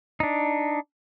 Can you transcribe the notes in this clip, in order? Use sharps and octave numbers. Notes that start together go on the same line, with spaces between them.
D4 D#4